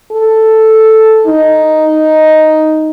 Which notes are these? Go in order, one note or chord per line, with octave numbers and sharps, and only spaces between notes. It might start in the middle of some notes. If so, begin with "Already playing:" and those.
A4
D#4